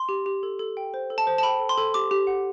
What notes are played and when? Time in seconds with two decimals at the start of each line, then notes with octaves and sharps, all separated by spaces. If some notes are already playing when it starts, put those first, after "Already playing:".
Already playing: C6
0.09 G4
0.26 G4
0.43 A4
0.59 A4
0.77 G5
0.94 C5
1.10 A4
1.18 A5
1.27 C5
1.38 A5
1.43 G5 B5
1.60 A4
1.69 C6
1.77 A4
1.94 G4 D6
2.11 G4
2.27 F#5